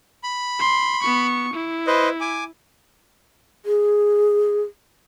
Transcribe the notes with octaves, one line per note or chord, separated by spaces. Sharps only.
B5
C6
B3 C#6
E4
B4 C5 D#5
G#5 D6
G#4